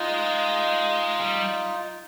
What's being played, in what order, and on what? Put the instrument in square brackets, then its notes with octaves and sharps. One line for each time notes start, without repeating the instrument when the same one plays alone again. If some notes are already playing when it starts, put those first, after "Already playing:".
Already playing: [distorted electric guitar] G#3 [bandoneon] D#4 F4
[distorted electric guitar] G3